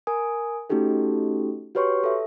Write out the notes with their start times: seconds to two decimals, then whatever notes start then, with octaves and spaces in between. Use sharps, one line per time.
0.07 A#4 G#5 D#6
0.70 A3 C#4 D#4 F#4 G4 A4
1.75 F#4 G4 B4 C#5 C6 C#6
2.04 A4 E5